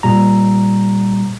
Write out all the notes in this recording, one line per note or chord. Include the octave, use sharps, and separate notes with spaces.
A#2 G3 A#5